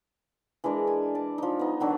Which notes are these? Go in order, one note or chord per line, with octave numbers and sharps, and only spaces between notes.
E3 G#3 D4 A#4
G#5
D5 A5
F3 D#4
B3 D#4
D3 D#3 F#3 D4